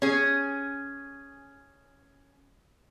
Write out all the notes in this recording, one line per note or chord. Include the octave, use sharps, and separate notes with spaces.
C#4 G#4